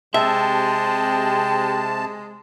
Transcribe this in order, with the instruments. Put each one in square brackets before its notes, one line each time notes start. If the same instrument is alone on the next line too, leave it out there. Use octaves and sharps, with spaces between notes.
[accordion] C3 A5 [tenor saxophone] G#3 [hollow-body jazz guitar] E5 [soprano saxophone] G5